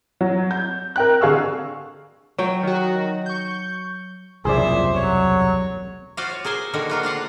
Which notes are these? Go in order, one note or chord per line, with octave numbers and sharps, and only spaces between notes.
F#3
G6
A#4 G5 F#6
D3 G#4 F5 C#6 E6
F#3 G5
D#3 F#4
C#6 G6
E1 C2 F#2 A#2 G#4 C5 D5 E5
F#3 C#5
F4 F#4 C5 D5 F5
C#5
G#4 A#4 C5 G#5
D3 D#3 A#3 F#4 A#4
A#3 F4 F#4
D4 F4 F5 F#5